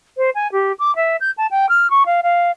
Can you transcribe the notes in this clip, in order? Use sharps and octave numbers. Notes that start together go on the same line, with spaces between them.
C5
G#5
G4
D6
E5
G6
A5
G5
F6
C#6
F5
F5